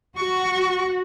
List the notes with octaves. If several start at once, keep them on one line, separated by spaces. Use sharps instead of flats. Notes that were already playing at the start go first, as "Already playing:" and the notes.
F#4 C#6